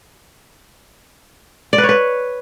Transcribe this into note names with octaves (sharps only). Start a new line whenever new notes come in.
D5
B4
C#5
B4